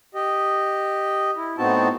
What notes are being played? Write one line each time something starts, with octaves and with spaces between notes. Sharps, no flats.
G4 D#5
E4
A2 B3 C4 D#4 F#4 A5